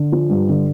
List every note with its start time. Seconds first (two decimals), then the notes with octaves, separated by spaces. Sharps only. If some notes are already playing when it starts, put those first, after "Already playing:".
Already playing: D3
0.12 F3
0.29 G2
0.49 D3